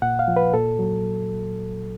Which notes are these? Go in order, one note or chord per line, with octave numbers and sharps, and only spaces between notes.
A#2 F#5
F5
F3
B4
A#2 A4
F#3